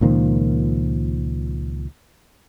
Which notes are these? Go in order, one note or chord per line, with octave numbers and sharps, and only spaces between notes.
C#2 A#2 D#3 F3